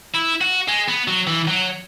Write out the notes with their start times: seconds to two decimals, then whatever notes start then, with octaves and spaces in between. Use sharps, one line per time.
0.15 E4
0.41 F#4
0.68 G#3
0.88 B3
1.08 F#3
1.27 E3
1.48 F#3